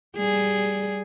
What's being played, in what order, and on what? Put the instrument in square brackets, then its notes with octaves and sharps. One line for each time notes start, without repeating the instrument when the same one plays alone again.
[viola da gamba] G3 G#4